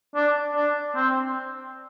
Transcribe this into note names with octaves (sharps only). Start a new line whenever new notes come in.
D4
D4
C4